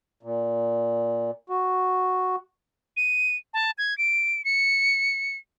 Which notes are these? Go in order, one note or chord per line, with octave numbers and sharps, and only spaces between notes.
A#2
F#4
D#7
A5
G#6
D7
C#7